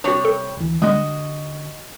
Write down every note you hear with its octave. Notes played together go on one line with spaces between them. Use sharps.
C3 G3 D4 F#4 C#5
A4
D2 E3
D3 G3 G#3 F#4 D#5